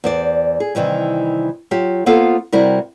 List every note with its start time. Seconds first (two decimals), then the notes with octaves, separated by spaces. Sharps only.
0.04 E2 C5 D5
0.60 G#4
0.75 C3 D#3 E3 G3
1.71 F#3 F4 G4
2.06 A#3 B3 F4 A4 C5 F5
2.53 C3 G3 E4 F#4 A#4